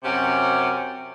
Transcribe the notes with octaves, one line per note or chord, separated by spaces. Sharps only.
F#2 C3 C#4 G4 F#5